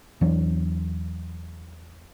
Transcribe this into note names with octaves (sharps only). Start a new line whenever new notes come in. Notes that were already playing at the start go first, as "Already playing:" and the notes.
E2 E3 F#3 D4